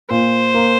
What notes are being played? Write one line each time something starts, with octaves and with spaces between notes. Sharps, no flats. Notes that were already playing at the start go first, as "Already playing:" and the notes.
A#2 C5
A#3